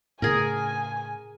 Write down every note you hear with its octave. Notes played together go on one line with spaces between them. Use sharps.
A2 C#3 G#4 A#4 G#5